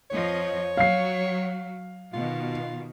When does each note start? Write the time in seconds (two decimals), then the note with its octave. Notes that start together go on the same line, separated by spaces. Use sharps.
0.11 F2 F3 C#5 D#5
0.77 F#3 F5 C7
2.13 B2 D#3 F4